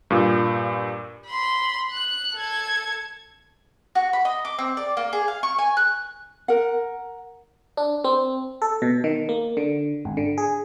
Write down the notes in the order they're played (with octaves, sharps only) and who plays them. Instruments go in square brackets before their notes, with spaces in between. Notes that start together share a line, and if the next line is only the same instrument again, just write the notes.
[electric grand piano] G2 A#2
[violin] B5 C6
F#6
A4 G#6
[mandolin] F#4
B5
D#5
D6
C4
D5
A#3
G#4
F5
C#6
G#5
F#6
[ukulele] A#4 F#5
[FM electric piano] D4
C4
A4
B2
D#3
A#3
D3
G#1
D3
G#4